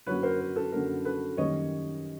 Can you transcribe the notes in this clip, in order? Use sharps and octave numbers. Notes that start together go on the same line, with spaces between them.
F#2 D3 F#3 A#3 C#4 B4 C#5
A#4 C5
A#4
A4
F#2 D3 F#3 A#3 C#4 A#4
A4 B4
F#2 D#3 G3 A#3 C#4 C#5 D#5